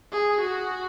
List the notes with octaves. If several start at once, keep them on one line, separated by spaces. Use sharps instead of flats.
G#4
F#4